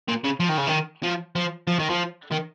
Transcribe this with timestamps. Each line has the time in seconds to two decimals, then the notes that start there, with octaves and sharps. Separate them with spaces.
0.08 A#2
0.24 C#3
0.40 F3
0.49 D#3
0.58 C#3
0.67 D#3
1.03 F3
1.36 F3
1.67 F3
1.79 D#3
1.90 F3
2.31 D#3